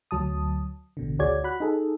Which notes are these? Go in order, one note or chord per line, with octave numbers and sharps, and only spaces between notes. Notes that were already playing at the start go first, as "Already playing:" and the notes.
D2 F#3 A5 D#6
A1 B2 D3
D2 F#4 G#4 C#5 D5 G#6
F#4 B5 F#6
D#4 G#4 A4